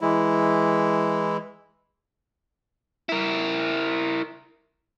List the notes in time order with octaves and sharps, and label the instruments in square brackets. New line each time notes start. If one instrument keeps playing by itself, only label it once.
[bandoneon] E3 G#3 E4
[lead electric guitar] E4 A#4